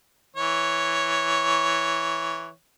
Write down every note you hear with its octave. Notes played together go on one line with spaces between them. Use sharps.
E3 C#5